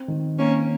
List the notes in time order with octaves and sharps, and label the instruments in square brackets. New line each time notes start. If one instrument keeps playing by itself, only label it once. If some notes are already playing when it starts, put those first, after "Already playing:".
Already playing: [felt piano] C4
D#3
[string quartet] A#3 C#4 [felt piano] C4